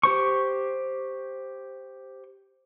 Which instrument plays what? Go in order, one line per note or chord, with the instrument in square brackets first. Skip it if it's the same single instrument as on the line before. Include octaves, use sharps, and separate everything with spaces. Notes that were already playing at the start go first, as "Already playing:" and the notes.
[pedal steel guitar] G4 C5 C#6